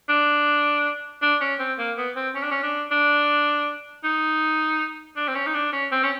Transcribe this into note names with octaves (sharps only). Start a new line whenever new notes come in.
D4
D4
C#4
C4
A#3
B3
C4
C#4
D4
C#4
D4
D4
D#4
D4
C4
C#4
D#4
D4
C#4
C4
C#4